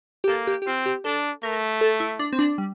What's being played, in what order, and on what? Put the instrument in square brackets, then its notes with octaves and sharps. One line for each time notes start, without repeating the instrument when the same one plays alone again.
[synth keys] G4
[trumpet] A#3 [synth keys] A4
[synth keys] G4
G4
[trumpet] C4 [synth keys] F4
[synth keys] G4
[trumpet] D4 [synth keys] A4
[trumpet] A3 [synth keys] A#4
[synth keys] A4
E4
D4
C4
D4
G3